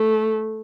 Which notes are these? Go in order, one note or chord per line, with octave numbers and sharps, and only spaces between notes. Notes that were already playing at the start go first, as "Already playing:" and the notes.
Already playing: A3